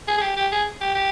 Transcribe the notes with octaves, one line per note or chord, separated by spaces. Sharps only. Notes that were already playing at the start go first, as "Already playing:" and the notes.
G#4
G#4
G4
G4
G#4
G4
G4